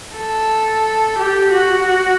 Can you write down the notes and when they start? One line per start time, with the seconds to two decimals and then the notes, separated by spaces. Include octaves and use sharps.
0.16 A4
1.18 G4
1.52 F#4